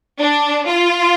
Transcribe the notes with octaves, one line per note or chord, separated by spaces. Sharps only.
D4
F4